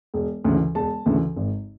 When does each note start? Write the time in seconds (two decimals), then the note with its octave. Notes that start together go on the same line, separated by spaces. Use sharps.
0.14 E1
0.45 D2 C#3 E3
0.75 E1 A5
1.06 D2 C#3 E3
1.36 G#1